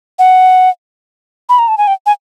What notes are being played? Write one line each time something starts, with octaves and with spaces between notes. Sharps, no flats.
F#5
B5
A#5
A5
G#5
G5
G#5